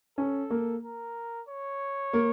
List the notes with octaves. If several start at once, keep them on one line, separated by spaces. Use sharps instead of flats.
C#4 A4
A#3
A#4
C#5
A#3